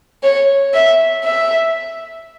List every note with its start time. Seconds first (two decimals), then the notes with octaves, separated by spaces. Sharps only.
0.23 C#5
0.73 E5
1.24 E5